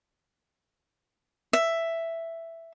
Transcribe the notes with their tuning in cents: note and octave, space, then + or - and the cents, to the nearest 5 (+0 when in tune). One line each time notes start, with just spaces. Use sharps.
E5 +5